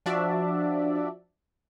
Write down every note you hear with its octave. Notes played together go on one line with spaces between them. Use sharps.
F3 D4 F#4 D5 E5